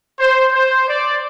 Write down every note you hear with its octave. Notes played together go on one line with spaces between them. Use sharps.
C5
C5
D5